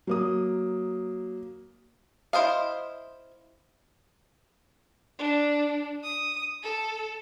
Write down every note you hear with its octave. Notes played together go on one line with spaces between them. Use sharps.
F#3 A#3 D#6
E4 C5 D#5 F5
D4
D#6
A4